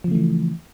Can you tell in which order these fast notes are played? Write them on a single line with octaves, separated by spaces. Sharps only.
F3 C#3 A3 E3